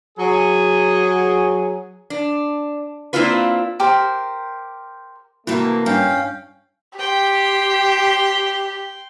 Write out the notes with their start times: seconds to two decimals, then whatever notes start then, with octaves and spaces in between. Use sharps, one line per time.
0.18 F#3 G#4
2.10 D4
3.13 A#3 C4 D4 E4 F4 B4
3.80 G4 A#4 C5
5.47 C3 E3 A3 A#3 E4 F#4
5.86 G2 C#4 F5 G5
6.98 G4 G5 C6